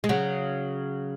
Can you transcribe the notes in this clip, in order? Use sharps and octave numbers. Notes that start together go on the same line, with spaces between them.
G#3
C#3 F#3